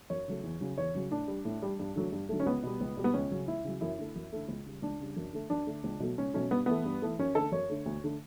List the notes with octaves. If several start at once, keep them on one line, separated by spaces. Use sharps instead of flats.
F#2 C#5
C#3 F#3 A3
E2
C#3 F#3
E2 C#5
C#3 F#3
A2 D4
G3
A2
G3
G2
D3 F#3 A3
G2
D3 F#3 A3
C#4
C#2 B3
B2 G3
C#2
B2 G3
B3
C#2 C#4
C#3 F#3
C#2 E4
C#3 F#3
F#2 E4
D3 A3
F#2
D3 A3
C#2
C#3 G3
C#2 D4
C#3 G3
F#2
D3 A3
F#2 D4
D3 A3
C#2
B2 F#3 A3
C#2 C#4
B2 F#3 A3 C#4
G2 B3
E3 A3 B3
G2
E3 A3
F#2 C#4
D3 A3 A4
F#2 C#5
D3 A3
D2
D3 A3